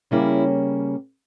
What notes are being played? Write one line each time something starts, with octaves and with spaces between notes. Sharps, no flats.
C#3 G3 A#3 C#4 E4 G#4